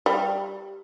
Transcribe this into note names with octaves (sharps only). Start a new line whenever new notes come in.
G3